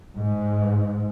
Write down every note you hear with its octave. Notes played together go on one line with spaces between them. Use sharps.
G#2